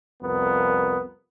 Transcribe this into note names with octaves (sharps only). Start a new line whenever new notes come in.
C2 F2 B3 A#4